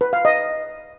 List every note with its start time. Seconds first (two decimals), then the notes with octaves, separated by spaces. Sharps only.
0.01 B4
0.13 F5
0.25 D#5